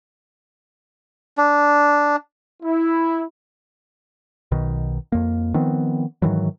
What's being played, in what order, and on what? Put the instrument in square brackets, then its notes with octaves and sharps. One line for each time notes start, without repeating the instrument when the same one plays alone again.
[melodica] D4
[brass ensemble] E4
[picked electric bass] B1 B2 D#3
F2 A#3
D#3 F3 B3 C4
G#2 D#3 E3 F#3